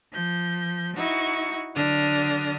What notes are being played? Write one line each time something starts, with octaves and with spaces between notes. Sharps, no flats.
F3 G6
D#4 E4 F#4 C#6
D3 F#3 D4 D#6 F6